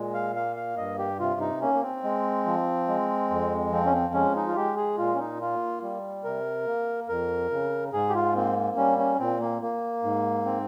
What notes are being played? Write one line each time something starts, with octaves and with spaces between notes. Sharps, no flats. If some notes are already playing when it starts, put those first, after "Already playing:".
Already playing: A#2 G#3
F5
A#3 F5
F5
G2 D#5
G4
C3 F4
D#4
A#3 C#4
A#3
C4
G#3
F3
G#3
F2
F3 C4
C#4
C4
G#3 C#4
D#4
F4
G#3 G4
G#4
A#2 F4
C#4
D#4
A#3 F4
G3
C3 A#4
A#3
F2 A#4
C#3
G#2 G#4
G4
F4
A#3 C4
G3 C#4
C#4
A#2 C4
A#3
A#3
G#2
C4